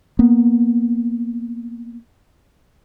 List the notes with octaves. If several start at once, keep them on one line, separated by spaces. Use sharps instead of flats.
A#3 B3